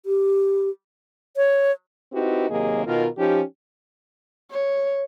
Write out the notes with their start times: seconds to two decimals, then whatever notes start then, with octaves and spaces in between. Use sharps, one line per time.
0.06 G4
1.37 C#5
2.12 C4 D#4 E4 F#4 G4 B4
2.49 D#2 C3 F#3 A#3 G#4 D#5
2.86 B2 D#3 F4 A#4
3.18 F3 C#4 D#4 G4
4.51 C#5